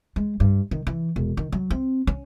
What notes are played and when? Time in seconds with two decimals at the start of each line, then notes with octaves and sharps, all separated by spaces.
0.16 G#3
0.40 G2
0.71 D#3
0.87 E3
1.16 E1
1.37 D#3
1.52 F#3
1.71 C4
2.07 C#4